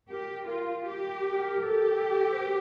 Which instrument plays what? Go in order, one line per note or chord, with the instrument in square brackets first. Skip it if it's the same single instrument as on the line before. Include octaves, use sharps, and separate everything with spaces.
[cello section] G4 [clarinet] A#4
[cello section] F4 [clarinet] A#4
[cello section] G4
[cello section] G4 [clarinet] A4
[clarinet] A4
A4
C5
A#4